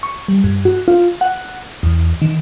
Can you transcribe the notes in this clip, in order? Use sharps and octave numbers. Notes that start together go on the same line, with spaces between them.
C#6
G3
G2
F#4
F4
F#5
E2
D#3